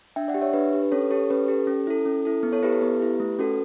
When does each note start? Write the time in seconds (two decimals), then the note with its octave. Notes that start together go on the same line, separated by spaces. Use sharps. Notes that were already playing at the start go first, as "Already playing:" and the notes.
0.16 D4 E5 G5
0.28 D5 F#5
0.34 G4
0.41 C#5 E5
0.53 D4 B4
0.73 G4
0.83 B4
0.92 C#4 A4 C#5
1.11 G4 A4 C#5
1.30 C#4 B4
1.48 G4 A4
1.67 C#4
1.87 E4 A4
2.06 C#4
2.25 E4 A4
2.43 B3
2.53 A4 C#5
2.63 E4 G4 B4
2.73 A4
2.81 B3 B4
3.00 E4 G4
3.20 A3
3.39 C#4 F#4 A4